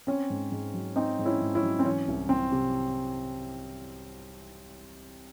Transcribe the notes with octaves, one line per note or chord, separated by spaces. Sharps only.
C4 C#4
G#2
G#2
F#3
C4 D#4
G#2
C#4 E4
G#2
C#4 E4
F#3
C4
E3 C#4
C2
C4
C3